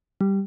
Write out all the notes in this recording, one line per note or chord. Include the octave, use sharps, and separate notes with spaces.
G3